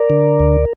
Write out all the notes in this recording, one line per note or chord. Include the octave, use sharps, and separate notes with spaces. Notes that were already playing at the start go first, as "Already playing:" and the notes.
Already playing: A#4 D5
D3
D2